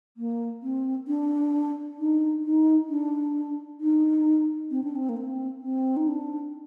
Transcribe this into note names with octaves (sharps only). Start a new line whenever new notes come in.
A#3
C4
D4
D#4
D#4
D4
D#4
C4
D4
C4
A#3
C4
C4
D#4
D4